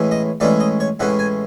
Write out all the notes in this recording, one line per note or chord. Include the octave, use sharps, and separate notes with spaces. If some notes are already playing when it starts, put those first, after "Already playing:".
Already playing: A2 E3 G#3 C#4
D#5
A2 E3 G#3 C#4 D5
D#5
C#5
A2 E3 G#3 C#4 F#5
G#5